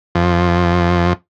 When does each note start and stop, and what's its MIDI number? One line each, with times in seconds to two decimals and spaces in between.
0.15 1.13 41